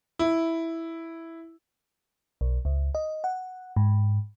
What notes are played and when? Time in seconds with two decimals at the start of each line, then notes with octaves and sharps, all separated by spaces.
0.19 E4
2.41 B1
2.65 C#2
2.95 D#5
3.24 F#5
3.76 G#2